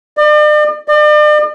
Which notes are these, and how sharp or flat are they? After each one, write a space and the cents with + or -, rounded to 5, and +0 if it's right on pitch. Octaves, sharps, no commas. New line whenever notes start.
D5 +40
D5 +40